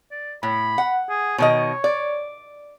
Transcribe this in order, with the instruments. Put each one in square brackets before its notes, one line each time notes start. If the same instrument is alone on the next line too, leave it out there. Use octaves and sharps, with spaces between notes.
[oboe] D5
[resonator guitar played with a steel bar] A2 [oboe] B5
[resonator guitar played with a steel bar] F#5
[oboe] G#4
[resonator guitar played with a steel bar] B2 D#3 D#5 [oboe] C#5
[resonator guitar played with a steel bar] D5